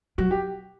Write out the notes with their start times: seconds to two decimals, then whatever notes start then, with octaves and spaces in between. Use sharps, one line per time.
0.18 F#3 F#4
0.31 G4